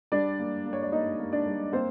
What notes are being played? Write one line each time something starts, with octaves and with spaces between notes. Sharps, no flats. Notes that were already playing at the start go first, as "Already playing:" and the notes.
G3 D4 D5
A#3
A#3
C#5
D5
A#3 D#4 D#5
A#3
D4 D5
G3
A#3 C4 C5